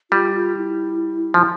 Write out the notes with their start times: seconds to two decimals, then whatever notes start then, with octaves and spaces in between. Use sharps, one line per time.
0.11 G3 F4
0.35 F4
0.57 E4
1.34 F3